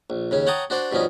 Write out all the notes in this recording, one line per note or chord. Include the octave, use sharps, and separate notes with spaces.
A#1
D#2 C#3 C#4
C#5 F#5 G5 A5 A#5 D#6
D4 F#4 C5 D5
G2 B2 F3 C#4 D#4